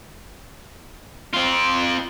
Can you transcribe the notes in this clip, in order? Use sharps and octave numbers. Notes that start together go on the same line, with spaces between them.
C4 F4